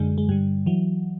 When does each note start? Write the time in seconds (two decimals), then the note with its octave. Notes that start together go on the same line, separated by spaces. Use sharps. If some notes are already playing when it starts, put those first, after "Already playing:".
Already playing: F#2 D3 G#3
0.18 G#3
0.29 G2 D3 G3
0.66 E3 F#3